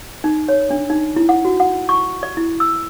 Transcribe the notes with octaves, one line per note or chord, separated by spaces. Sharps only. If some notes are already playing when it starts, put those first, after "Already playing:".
D#4
C#5
D4
D#4
E4
F#5
F#4
F#5
C#6
D5
E4
E6